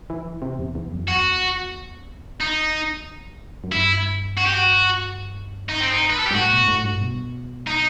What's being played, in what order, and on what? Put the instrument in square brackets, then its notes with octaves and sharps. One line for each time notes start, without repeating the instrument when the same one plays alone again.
[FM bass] E3
C3
E2
E2
F#2
[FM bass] E2 [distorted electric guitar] F#4
[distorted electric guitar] D#4
[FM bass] F#2
[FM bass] G2 [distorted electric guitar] E4
[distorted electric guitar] F#4
G4
F#4
D#4
C4
D#4
B4
A4
G4
[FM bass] G2
[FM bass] A2 [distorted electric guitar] F#4
[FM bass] B2
G2
A2
G2
B2
[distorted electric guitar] D#4